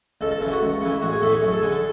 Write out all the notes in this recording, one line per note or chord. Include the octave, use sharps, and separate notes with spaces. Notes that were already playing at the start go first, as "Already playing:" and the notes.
C#2 A4
A4
C#3 E3 A4
F#4
C#2
C#3 E3
A1 F#4
G#4
A2 E3 A4
G#4
F#2
A4
D3 G#4
A4